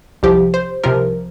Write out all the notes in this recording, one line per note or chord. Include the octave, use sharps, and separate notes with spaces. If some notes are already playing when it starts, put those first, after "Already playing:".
C2 C3 F3 G4
C5
C2 C3 F3 A#4